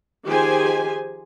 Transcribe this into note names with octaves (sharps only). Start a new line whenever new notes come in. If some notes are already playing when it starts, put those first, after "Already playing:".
D#3 F3 G4 G#4 C5 G#5